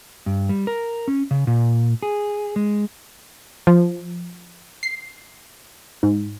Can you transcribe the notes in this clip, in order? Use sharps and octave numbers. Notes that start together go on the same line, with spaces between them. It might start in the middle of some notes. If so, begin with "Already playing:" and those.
G2
G3
A#4
C#4
C#3
A#2
G#4
G#3
F3
C7
G#2